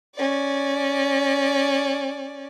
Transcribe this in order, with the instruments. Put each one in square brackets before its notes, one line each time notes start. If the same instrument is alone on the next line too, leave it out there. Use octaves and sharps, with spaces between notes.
[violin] C#4 D5